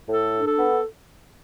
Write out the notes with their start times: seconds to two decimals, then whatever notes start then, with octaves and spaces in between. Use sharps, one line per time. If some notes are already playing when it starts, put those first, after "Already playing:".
0.09 A2 A4
0.34 D4
0.46 A4
0.58 B3